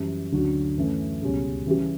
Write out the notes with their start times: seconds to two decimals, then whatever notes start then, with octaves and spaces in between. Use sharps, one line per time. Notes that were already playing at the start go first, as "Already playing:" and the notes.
Already playing: F#2 E3 G3
0.32 D2 D3 F#3 C#4 F#4
0.77 F#2 E3 A3 C#4
1.21 C#2 B2 G3 C#4
1.66 C#3 E3 G3 C#4 G4